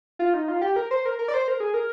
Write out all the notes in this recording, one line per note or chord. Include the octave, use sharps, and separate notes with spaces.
F4
D#4
F4
G4
A#4
C5
A#4
A#4
D5
C5
A#4
G#4
A#4